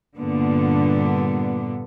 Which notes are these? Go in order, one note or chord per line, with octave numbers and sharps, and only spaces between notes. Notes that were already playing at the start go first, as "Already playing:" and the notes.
G2 A#2 D3 B3